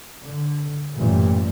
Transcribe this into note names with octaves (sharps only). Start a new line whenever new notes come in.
D3
A1 F#2 A#2 E3 G3